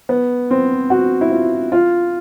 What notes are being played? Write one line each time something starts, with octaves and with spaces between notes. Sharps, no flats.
B3
C4
F#4
E4
F4
F4